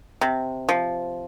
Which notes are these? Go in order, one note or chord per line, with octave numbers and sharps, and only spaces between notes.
C3
F3